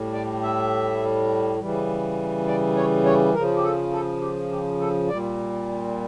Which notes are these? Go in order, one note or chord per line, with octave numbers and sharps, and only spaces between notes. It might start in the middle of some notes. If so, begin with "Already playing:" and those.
Already playing: A2 G3
D5
E5
C#3 E3 G3
D5
C#5
C#5
C#3 F3 A#4
G4
A4
A4
G4
G4
A4
A#2 G3 D5